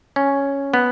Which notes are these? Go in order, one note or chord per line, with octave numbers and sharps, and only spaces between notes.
C#4
B3